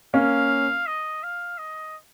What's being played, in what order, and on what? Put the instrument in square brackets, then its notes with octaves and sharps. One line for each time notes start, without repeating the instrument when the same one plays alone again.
[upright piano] A#3 C#4 [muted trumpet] F5
[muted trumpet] D#5
F5
D#5